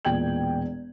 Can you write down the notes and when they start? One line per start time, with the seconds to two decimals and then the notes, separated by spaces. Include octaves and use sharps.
0.05 E1 A#2 G5 G#6 F#7